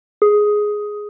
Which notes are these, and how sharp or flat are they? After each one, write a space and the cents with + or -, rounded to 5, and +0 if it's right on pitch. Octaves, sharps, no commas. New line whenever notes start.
G#4 +5